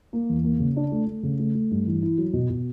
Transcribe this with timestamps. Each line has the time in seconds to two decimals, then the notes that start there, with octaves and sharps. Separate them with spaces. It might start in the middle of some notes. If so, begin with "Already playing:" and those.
0.13 A#3
0.29 E2
0.44 A#3
0.60 C#3
0.76 D4
0.92 A3
1.07 A3
1.23 C#3
1.39 A3
1.55 A3
1.71 G2
1.87 E3
2.02 E4
2.18 F#3
2.33 B2
2.50 B2